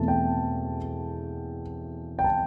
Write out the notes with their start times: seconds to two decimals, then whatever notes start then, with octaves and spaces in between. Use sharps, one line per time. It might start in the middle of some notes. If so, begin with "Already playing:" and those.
Already playing: E2 B2 A3 C4 A5
0.08 G5
2.19 G5
2.24 A5